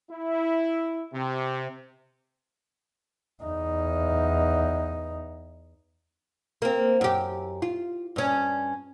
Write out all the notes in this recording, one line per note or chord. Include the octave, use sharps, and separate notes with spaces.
E4
C3
E2 D#4
A#3 C4
F#2 G4
F4
G2 C#4